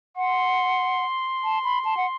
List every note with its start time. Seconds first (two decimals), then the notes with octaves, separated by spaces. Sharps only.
0.17 F#5 C6
1.44 A5
1.64 B5
1.85 A5
1.97 F#5